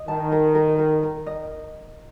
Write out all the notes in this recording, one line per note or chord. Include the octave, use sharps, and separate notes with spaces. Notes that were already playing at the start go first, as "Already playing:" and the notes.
Already playing: D#5
D#3 A5
A#4
A#4
A#4
A#4
D#5